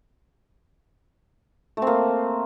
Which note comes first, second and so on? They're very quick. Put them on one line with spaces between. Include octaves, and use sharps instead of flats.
A3 C4 A#3